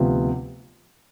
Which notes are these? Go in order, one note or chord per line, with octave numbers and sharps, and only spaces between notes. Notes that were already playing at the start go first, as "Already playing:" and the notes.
Already playing: D2 C3 F3 B3 F4